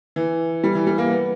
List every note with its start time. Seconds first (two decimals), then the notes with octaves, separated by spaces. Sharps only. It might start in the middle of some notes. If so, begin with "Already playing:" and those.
0.16 E3
0.64 G3
0.75 E3
0.87 G3
0.98 A#3
1.10 B3